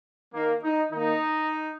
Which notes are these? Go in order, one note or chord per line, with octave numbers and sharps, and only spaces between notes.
D#3 A#3
D#4
D#3 A#3 D#4